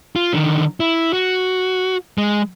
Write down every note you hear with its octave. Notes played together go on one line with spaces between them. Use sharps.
F4
D3 D#3
E4
F#4
G#3